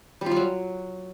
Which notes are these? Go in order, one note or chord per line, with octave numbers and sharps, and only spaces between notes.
G3
F4
G3
F#3